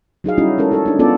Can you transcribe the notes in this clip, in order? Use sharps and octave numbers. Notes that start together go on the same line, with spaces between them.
F#3 D#4 G#4 F5
G3 C#4 D#4 E4 F#4
G#3 C#4 A4 A#4
D#4 A4 C#5
D4 D#4
B3 C#4 D4 F4 A4 D5